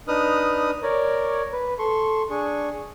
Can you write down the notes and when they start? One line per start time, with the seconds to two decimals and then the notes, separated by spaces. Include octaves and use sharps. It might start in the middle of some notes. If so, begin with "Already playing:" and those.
0.08 D4 D#4 B4 D#6 F6 F#6
0.83 A#4 C#5 D5
1.53 B4
1.79 A4 C6 C#6
2.30 D4 G#4 C#6